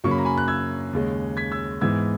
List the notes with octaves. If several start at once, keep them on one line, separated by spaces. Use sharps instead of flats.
F#2 C#3 F#3 A#3 C#4 C#6
B5
A#5
G#5 B5
F#6
E6 G#6
D#2 C#3 G#3 C#4
G#6 B6
E6 G#6
G#2 E3 G#3 B3 E6 G#6